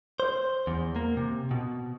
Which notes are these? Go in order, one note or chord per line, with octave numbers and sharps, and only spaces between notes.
C5
E2
A#3
C3
B2